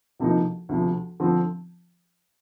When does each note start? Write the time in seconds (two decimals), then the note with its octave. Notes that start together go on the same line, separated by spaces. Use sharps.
0.19 D2 C3 F3 A#3 D#4
0.69 D2 C3 F3
1.20 D3 F3 C4